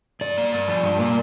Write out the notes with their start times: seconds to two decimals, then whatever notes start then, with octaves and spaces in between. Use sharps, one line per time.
0.21 G2 D5
0.37 A#3
0.53 G2
0.68 F3
0.83 G2
0.99 A#3